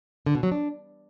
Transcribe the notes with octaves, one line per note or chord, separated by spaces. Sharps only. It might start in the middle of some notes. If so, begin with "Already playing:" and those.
D3
B2
F#3
D4